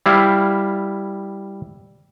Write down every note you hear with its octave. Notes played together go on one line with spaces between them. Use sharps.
G3 E4 F5